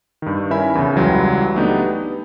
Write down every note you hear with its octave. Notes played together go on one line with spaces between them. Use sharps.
G2 D#3
C#4 E4 A#4 E5 G#5 B5
E2 C#3
C#2 E3 F#3 G3 G5 C6
A3 B3 D4 D#4 G4
B4